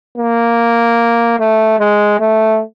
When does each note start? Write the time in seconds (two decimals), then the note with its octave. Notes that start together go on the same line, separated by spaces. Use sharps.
0.18 A#3
1.40 A3
1.79 G#3
2.20 A3